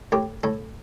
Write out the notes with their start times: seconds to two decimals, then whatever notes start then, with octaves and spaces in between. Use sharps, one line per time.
0.12 A2 G4
0.43 A2 A4